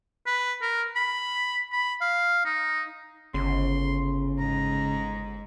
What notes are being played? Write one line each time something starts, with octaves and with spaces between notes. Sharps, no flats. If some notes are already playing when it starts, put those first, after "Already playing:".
B4
A#4
B5
B5
F5
D#4
G1 C#3 C6
G#2 A#5